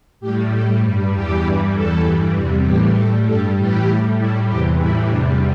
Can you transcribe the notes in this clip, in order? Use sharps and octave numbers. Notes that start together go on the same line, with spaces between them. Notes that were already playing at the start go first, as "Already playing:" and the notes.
A2 G3 G4
A2 G3 A4
G2 G3
E2 E3 G3 G4
G2 E3 G3
E2 E3 G3 A4
G2 E3 G3
E2 C3 G3
A2 E3 G3 G4
A2 G3 A4
G2 G3 A4
A2 E3 G3 G4
A2 G3
A2 G3 E4
E2 C3 E3 G4
A2 E3 G3 E4
E2 C3 G3 D4